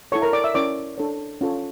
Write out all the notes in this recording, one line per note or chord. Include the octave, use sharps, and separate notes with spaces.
E4 A4 C#5 C#6
A#4 A#5
D5 D6
E5 E6
C#4 E4 A#4 C#5 D5 D6
D4 A4 C#5
C#4 F4 A4 C#5